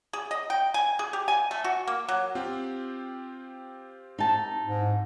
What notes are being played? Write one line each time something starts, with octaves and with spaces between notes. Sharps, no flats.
G#4
D#5
G5
G#5
G#4
G4
G#5
A3
F#4
A#3
F#3
C4 F4 G4
D#4 A5
G#2